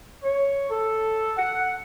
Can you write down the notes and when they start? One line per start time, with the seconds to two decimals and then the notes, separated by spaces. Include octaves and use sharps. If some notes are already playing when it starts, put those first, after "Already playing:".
0.23 C#5
0.70 A4
1.37 F#5